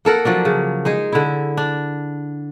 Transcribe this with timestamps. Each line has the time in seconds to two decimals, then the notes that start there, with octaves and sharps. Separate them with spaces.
0.05 A#3 A4 A#4 F#5
0.25 F3 F#3 D4
0.45 C#3
0.85 G#3 D#4 G#4
1.12 D3 E4
1.57 D4